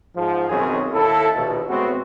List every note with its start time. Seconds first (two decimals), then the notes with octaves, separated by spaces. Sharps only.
0.16 G#2 F3
0.49 B1 F#2 D#3 C4 C#4 G#4
0.93 D#2 E4 A4
1.34 A#1 D#2 B2
1.68 A2 G#3 B3 C4 F#4